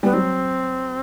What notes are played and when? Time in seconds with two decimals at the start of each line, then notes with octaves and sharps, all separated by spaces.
0.03 G3 B3
0.13 F#3 C4